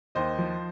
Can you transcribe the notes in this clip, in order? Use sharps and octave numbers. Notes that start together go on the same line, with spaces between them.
D#2 C5 D#5
F3